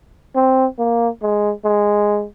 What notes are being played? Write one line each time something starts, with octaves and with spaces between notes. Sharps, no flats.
C4
A#3
G#3
G#3